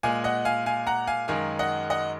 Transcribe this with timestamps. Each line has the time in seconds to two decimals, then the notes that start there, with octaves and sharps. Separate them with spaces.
0.03 A#2 G#3 F5 G#5
0.24 D#5 F#5
0.45 F5 G#5
0.66 F5 G#5
0.87 F#5 A#5
1.07 F5 G#5
1.28 F#2 D#3 G#3 F5 G#5
1.59 D#5 F#5
1.90 D#5 F#5